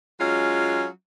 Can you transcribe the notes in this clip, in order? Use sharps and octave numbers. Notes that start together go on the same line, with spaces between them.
F#3 G#3 C#4 F4